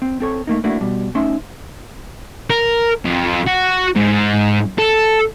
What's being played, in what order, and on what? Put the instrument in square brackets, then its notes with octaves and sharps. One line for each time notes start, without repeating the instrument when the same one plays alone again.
[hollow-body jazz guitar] C4
C4 A4 C#5
A3 A#3 D#4
A3 A#3 D4 E4 F#4
B2 G3
A3 C#4 D#4 E5 C6
[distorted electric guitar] A#4
F2
F#4
G#2
A4